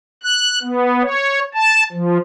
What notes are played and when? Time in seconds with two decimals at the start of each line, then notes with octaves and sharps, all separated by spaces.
0.23 F#6
0.62 B3
1.03 C#5
1.54 A5
1.92 F3